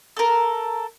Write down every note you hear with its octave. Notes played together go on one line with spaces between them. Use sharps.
A4 A#4